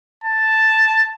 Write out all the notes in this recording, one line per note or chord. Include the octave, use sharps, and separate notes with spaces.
A5